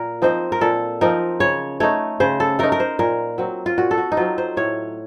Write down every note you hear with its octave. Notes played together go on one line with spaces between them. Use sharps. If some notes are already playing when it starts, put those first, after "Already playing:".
Already playing: A#2 A#4
F3 C4 D#4 C5
A#4
A#2 A4
F3 C4 D#4 A#4
C#3 C#5
A3 D#4 C#5
C#3 C5
A4
A3 D#4 A#4
A#4
C5
A#2 A#4
F#3 C4
F4
A#2 F#4
A4
F#4
D#4
F#3 C4 F4
C5
A2 C#5